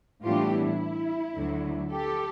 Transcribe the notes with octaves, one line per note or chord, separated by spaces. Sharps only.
A2 E3 G3 B3 D4 F4 G4
E4
D2 D3 F#3
G4 A4